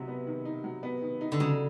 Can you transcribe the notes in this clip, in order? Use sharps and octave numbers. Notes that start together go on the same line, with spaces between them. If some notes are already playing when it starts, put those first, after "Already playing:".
Already playing: C3 F#3 D#4
B3
D#3
D#4
F#3
B3
D#3
D#4
D3
C#3 F#3